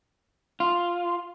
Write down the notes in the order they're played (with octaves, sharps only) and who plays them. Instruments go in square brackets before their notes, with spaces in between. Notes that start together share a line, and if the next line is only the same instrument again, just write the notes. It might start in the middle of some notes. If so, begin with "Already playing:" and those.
[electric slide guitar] F4